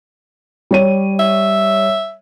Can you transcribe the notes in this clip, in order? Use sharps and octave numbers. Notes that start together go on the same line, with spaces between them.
G3 C#5 D#7
E5